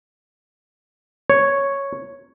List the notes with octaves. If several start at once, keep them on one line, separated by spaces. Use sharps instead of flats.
C#5